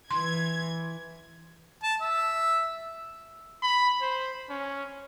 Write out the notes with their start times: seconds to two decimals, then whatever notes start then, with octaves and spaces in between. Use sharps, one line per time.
0.11 E3 C6 G#6
1.83 A5
2.01 E5
3.63 B5
4.01 C5
4.50 C#4